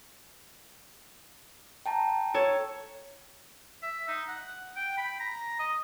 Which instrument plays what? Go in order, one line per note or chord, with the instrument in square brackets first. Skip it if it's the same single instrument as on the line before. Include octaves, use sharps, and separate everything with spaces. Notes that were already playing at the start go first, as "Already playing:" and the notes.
[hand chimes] G5 A5 A#5
[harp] A4 C#5
[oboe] E5
D#4
F#5
G5
B5
A#5
D#5